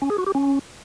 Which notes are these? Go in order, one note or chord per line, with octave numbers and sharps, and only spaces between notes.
C#4
G#4
F#4
G4
C#4